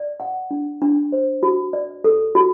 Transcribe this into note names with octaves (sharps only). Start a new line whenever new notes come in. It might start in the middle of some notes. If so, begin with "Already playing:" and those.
Already playing: D5
F#5
D4
D4
C5
F#4
D5
A4
F#4